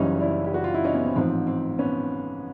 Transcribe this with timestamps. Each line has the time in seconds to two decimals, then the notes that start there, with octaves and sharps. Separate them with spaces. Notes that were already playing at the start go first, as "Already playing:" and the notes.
Already playing: F#1 F#2 C#3 E3 G3 C#4 D#4
0.21 D4 E4
0.44 G4
0.54 F#4
0.64 F4
0.74 E4
0.84 C#4 D#4
0.94 B3 C#4
1.05 C4
1.15 A1 G#2 F3 C4
1.47 C4
1.79 B3 C#4